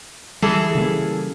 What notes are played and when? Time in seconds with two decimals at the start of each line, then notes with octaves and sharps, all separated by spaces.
0.42 E3 G3 G#4 A4
0.75 C#3 G3 A#3